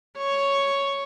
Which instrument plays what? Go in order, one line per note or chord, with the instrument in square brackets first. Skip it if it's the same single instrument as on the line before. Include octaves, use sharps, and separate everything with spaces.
[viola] C#5